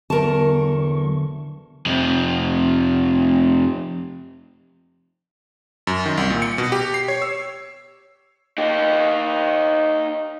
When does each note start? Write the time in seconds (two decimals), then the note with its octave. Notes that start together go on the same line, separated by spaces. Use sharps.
0.10 E2 D3 F#3 B3 A#4 A5 C#6
1.86 F2 C3
5.87 F#2
6.06 D#3
6.17 C2
6.30 A#2
6.42 C#7
6.58 B2
6.72 G4
6.94 C7
7.08 C#5
7.22 E6
8.58 D#4 G4